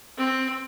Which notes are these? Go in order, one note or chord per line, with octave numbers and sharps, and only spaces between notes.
C4